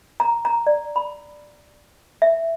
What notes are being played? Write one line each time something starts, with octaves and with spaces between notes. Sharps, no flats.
A#5
A#5
D5
B5
E5